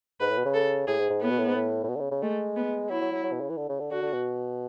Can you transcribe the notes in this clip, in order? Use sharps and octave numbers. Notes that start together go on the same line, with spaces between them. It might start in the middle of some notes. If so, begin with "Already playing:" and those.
G#2 B4
A2
B2
C#3
A4
A2 G#4
G#2
G#2
A2 B3
B2
A2
G#2
A2
A2
B2
D3
C#3
C#3
G#3 A3
B3
F#3 E4
F#3
F#3
F#3
B2
C#3
E3
D3
C#3
D3
D3 F#4
D3
B2